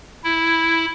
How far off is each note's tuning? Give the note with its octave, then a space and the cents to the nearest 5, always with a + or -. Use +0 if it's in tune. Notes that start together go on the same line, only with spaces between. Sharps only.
E4 +0